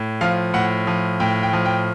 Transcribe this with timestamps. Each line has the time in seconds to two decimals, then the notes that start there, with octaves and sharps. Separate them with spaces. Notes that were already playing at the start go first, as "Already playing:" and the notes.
Already playing: A2
0.21 F3 F5
0.54 A2 F#5
0.87 F3
1.20 A2 G5
1.43 G5
1.53 F3
1.65 G5